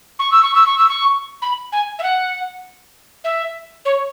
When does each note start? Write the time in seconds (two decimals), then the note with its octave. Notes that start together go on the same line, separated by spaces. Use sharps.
0.19 C#6
0.31 E6
0.43 C#6
0.55 E6
0.66 C#6
0.78 E6
0.89 C#6
1.42 B5
1.72 G#5
1.99 E5
2.03 F#5
3.24 E5
3.85 C#5